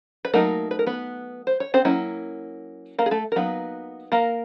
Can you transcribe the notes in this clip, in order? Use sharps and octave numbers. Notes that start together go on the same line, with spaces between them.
B4
F#3 A3 A#3 D#4 A#4
B4
A#4
B3 B4
C5
C#5
C4 C5
F#3 A#3 C#4 E4
A#3 A#4
G#4
A3 A4
A#4
F#3 A#3 B3 D#4 B4
A#3 A#4